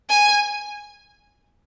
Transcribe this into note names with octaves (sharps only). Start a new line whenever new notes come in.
G#5